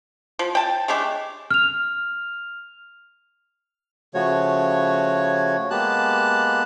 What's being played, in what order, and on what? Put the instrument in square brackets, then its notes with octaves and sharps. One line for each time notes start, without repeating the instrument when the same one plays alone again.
[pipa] F3
G5 A5
G#3 A3 D4 G4
[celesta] F6 F7
[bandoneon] C#3 F3 A3 F#4 C#5
G#3 A#3 B3 G4 A5 F#6